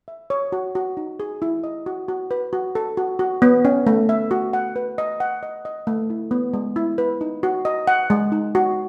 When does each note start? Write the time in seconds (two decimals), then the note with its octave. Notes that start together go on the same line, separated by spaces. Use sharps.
0.08 E5
0.30 C#5
0.52 F#4
0.75 F#4
0.97 D#4
1.20 G#4
1.42 E4
1.64 D#5
1.86 F#4
2.08 F#4
2.31 B4
2.53 F#4
2.75 A4
2.97 F#4
3.19 F#4
3.42 B3
3.65 C#4
3.87 A3
4.09 E5
4.31 F#4
4.53 F#5
4.76 B4
4.98 D#5
5.20 F#5
5.43 D#5
5.65 D#5
5.87 A3
6.10 E4
6.31 B3
6.54 G#3
6.76 E4
6.98 B4
7.21 D#4
7.43 F#4
7.65 D#5
7.88 F#5
8.10 G#3
8.32 D#4
8.55 F#4